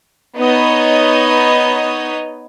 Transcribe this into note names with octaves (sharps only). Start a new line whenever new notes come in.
B3 D#4 C#5 D#5